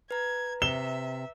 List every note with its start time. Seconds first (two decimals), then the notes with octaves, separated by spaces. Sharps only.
0.11 B4 A#5 G#6
0.62 C3 E5 E7 G7